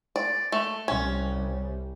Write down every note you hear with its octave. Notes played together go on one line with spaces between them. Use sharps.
D5
A3
C2 G3 C#4